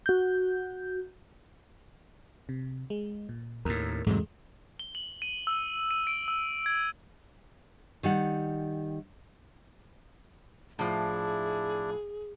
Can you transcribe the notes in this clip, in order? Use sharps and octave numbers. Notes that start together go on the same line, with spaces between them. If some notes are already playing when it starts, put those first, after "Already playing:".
F#4 G6
C3
G#3
A#2
D#2 A2 A#4
E2 G#2 C3 F#3 G#3 A3
G7
F#7
D#7
E6
D#7
D7
E6
G#6
D#3 G3 F#5
A2 F3 D4 E4 G#4